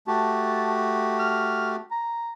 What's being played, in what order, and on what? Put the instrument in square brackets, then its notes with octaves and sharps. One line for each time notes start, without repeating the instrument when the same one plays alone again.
[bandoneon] A3 F#4 G4 [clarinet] A5
[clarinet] F6
A#5